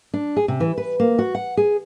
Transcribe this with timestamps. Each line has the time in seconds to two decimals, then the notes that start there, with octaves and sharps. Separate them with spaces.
0.14 D4
0.37 G#4
0.48 C3
0.60 E3
0.78 B4
1.00 A#3
1.19 F#4
1.35 F#5
1.57 G#4